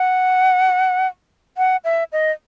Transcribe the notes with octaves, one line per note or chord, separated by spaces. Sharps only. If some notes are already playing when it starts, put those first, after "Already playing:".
Already playing: F#5
F#5
E5
D#5